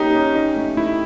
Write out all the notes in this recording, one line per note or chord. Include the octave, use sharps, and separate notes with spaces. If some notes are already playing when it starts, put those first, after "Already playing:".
Already playing: A#3 C#4 D#4 G4
C#4
D#4
A3
A3 E4